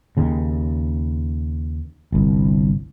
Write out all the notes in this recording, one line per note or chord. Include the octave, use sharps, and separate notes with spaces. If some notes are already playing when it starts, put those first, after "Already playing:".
D#2 C#3
G1 C2